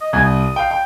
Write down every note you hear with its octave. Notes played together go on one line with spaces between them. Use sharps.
D#5
C2 G#5
D#6
F5 G5
G5